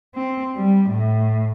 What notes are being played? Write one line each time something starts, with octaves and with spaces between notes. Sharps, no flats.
C4
G3
A2